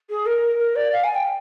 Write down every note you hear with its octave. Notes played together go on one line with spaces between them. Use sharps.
G#4
A#4
A#4
D5
F5
G#5
G5